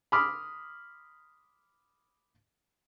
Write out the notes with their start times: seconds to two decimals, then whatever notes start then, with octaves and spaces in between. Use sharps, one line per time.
0.12 B5 C6 D6 D#6 F6